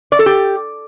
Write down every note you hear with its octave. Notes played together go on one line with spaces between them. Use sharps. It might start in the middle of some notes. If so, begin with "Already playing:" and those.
D5
A4
G4